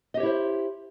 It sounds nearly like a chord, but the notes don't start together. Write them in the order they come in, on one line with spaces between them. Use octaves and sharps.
D#5 G4 C#5 E4 C5